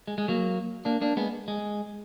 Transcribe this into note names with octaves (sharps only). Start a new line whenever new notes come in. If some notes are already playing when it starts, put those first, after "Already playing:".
G#3
G#3
F#3 A#3
A#3 D4
A#3 D4
G#3 B3
G#3